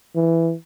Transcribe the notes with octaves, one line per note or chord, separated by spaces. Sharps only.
E3